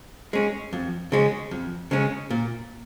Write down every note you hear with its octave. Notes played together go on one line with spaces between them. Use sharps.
G#3 C#4
F2
C#3 G#3 C#4
F2
C#3 G#3 C#4
A#2